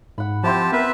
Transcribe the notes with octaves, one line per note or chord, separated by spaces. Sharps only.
G#2 F#5 B5
F3 C4 E4 G4 C5 A5
B3 A#4 B4 E5 A5